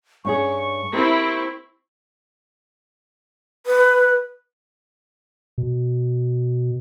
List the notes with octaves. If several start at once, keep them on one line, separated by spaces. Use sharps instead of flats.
G2 C#4 G#4 C#6
C4 E4 G4 A#4
B4
B2